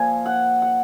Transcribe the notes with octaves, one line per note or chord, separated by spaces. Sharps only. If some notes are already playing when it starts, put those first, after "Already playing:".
Already playing: A#2 F3 F5 G#5
F#5
F#5